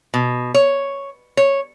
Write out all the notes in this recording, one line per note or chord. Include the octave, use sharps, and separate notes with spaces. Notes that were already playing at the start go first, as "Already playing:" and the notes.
B2
C#5
C#5